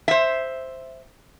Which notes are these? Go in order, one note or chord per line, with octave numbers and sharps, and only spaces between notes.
C5 E5